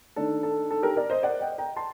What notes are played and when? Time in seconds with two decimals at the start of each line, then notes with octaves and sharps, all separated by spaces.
0.16 D#3 A3 D4 A4
0.43 A4
0.71 A4
0.83 G4 A#4
0.96 A#4 D5
1.10 C5 D#5
1.23 D5 F#5
1.41 D#5 G5
1.58 G5 A#5
1.76 A5 C6